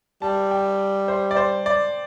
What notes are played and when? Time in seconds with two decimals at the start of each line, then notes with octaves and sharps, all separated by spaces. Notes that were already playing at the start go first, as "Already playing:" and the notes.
0.22 G3 A5
0.51 G5
1.08 C5
1.31 D5
1.36 C5
1.66 D5